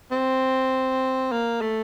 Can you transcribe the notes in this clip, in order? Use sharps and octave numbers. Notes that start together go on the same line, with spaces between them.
C4
A#3
A3